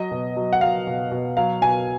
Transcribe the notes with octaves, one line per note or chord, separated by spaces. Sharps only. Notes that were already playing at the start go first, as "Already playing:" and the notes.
Already playing: F#3 D#5
B2
F#3
F#5
F#3 F5
B2
B2
F#3 F5
B2 G#5